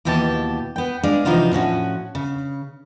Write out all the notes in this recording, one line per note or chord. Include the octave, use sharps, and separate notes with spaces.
D#2 B2 E3 G4 A4 A5
B3 G5
G#3 D4 G#4 F5
C3 E3 F3 D#4 F4 F#4
A2 F3 C#4 F#4
C#3